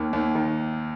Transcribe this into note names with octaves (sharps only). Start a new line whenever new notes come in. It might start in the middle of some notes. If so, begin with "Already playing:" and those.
Already playing: D#2 A#3
D#2
D#3